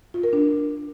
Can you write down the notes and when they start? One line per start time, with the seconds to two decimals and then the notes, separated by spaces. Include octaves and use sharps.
0.14 F4
0.24 A#4
0.33 D4